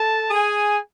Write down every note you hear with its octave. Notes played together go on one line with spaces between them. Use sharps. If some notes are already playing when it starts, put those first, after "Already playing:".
Already playing: A4 A5
G#4 G#5